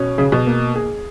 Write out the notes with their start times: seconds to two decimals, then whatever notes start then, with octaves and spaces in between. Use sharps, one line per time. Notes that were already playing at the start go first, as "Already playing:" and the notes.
Already playing: B2 C#4
0.18 C#3 G#4
0.32 B2
0.47 A#3
0.76 G#4